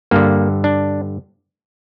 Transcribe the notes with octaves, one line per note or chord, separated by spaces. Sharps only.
G2 D3 A#3
D4